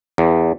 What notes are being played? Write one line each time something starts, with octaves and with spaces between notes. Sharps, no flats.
E2